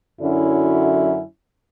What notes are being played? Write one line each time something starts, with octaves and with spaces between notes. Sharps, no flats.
F#2 D3 F#3 C#4 E4